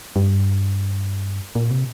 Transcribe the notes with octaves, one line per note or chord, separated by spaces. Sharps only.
G2
A#2
C3